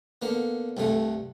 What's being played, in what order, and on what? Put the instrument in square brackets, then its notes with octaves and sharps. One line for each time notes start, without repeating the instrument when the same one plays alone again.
[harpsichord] D3 A#3 B3
C2 G2 D3 A3